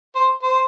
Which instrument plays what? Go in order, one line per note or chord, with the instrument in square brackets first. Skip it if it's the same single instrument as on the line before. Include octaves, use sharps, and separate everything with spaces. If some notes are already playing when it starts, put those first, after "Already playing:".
[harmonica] C5
C5